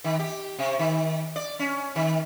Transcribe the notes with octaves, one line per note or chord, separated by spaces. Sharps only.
D#3
G4
C3
D#3
D5
C#4
D#3